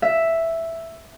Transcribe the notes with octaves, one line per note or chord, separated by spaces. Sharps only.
E5